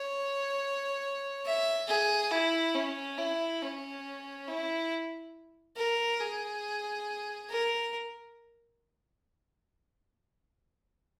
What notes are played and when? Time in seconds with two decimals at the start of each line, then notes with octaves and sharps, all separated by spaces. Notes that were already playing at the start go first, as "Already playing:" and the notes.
Already playing: C#5
1.46 E5
1.88 G#4
2.31 E4
2.75 C#4
3.18 E4
3.61 C#4
4.48 E4
5.77 A#4
6.20 G#4
7.49 A#4